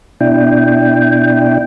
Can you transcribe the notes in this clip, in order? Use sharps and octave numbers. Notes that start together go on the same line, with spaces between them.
B2 D4 E4 G5